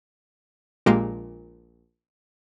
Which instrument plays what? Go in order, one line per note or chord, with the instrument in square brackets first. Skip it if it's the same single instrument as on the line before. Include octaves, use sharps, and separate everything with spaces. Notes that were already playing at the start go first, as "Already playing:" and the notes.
[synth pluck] A#1 A#2 G#3 A#3 G4 D7